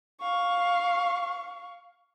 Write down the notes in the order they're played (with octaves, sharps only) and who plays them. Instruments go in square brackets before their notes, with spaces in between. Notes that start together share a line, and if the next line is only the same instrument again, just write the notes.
[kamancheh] F5 C#6